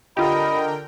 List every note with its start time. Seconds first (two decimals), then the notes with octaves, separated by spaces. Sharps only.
0.17 D3 F4 G4 A#4 D#5 G5 B5